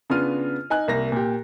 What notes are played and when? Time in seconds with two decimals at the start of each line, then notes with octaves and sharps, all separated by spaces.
0.10 C#3 B3 D4 F4 F6 D#7
0.70 D#4 G#5 F#6
0.88 C2 A#3 A#6
1.12 A#2 G4